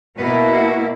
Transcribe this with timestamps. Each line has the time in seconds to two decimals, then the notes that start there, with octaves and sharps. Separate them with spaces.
0.18 B2 A#3 B3 E4 B4
0.50 F#4